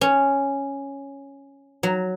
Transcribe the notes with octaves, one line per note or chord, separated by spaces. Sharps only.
C#4
F#3